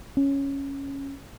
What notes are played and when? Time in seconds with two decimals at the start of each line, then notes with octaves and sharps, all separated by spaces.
0.17 C#4